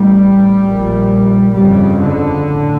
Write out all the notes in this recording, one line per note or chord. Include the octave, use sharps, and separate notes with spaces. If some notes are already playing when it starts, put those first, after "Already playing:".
Already playing: A1 A2 G3
A#1 A#2
G1 F2 C#3 G3
D3
A2